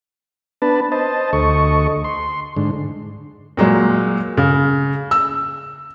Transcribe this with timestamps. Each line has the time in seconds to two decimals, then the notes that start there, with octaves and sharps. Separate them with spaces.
0.62 B3 D4 B4 A5
0.92 C5 D#5 A5
1.33 D2 A4 D#5 C#6
2.04 C6
2.57 G#2 D3
3.57 A#2 F#3 G#3
4.37 C#3
5.11 E6